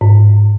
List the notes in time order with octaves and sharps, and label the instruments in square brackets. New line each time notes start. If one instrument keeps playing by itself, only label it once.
[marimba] G#2